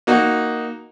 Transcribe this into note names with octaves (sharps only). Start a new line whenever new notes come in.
A#3 D#4 F#4